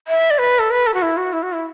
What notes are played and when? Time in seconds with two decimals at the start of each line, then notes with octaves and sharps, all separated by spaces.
0.08 E5
0.31 D5
0.39 B4
0.59 A4
0.71 B4
0.87 A4
0.94 F#4
1.02 E4
1.17 F#4
1.33 E4
1.43 F#4
1.53 E4